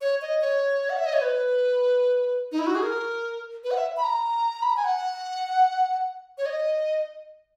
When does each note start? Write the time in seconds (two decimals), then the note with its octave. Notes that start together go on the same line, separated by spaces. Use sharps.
0.01 C#5
0.22 D#5
0.41 C#5
0.90 F#5
0.97 E5
1.06 D#5
1.14 C#5
1.21 B4
2.52 D#4
2.59 E4
2.67 F#4
2.75 G#4
2.83 A#4
3.64 B4
3.71 F#5
3.77 E5
3.97 B5
4.04 A#5
4.62 B5
4.70 A#5
4.76 G#5
4.85 F#5
6.38 C#5
6.46 D#5